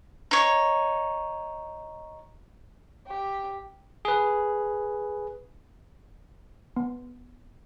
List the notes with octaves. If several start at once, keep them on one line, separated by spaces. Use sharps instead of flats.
D#4 C#5
G4
G#4 B4
B3